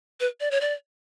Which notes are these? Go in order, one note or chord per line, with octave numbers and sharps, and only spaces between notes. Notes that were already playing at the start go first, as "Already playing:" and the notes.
B4
D5
C#5
D5